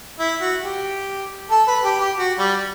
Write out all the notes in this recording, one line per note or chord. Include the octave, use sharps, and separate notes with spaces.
E4
F#4
G4
A4
B4
G4
G4
F#4
G3